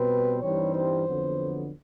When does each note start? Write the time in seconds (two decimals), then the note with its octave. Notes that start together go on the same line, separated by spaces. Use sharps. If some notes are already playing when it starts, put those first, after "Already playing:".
Already playing: B2 G3 C4 B4
0.41 G2 E3 G3 C4 D#4 C#5
0.74 C5
1.06 F2 D3 F#3 B3